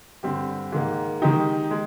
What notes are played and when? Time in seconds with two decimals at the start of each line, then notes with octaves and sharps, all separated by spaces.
0.23 G2 D3 G3 C4 G4
0.72 G#2 D#3 A#3
1.22 D#3 G#3 D#4 G4
1.71 G#3